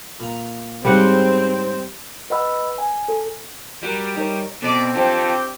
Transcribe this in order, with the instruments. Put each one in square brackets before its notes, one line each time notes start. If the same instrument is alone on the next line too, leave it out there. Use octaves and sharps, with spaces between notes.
[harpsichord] A#2 A#5
[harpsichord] G#2 C#3 D4 [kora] G3 F#5 [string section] C4
[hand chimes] B4 D#5 F#5 B5 E6
G#5
A4
[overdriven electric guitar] G3 [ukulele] F#4 A#4
[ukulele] D#4 A#4 C#5
[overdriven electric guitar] B2 [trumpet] C4 [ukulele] A4 D#5 [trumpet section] D5
[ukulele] D4 C5 G5 [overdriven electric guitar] F4 A4 [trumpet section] G4